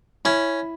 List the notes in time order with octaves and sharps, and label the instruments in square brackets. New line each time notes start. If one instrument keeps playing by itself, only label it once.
[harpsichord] C#4 [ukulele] E4